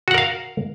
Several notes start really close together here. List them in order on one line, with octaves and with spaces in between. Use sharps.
F#4 F#5 A#4 F5